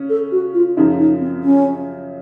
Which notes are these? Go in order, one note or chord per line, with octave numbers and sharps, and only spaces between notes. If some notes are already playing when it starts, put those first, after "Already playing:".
Already playing: C#3 C#4
A4
F#4
F4
F#2 C#3 F3 D#4
D#4
C4
C#4